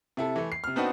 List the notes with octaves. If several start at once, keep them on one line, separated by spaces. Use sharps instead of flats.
C3 E4 A4
E3 A3
C7
C3 F6
B3 C4 D4 D#4 F#4 B4